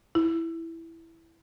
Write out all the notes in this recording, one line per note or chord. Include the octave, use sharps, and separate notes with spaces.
E4